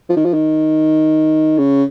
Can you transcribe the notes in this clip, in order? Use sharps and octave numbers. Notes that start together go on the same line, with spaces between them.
F3
D#3
F3
D#3
C#3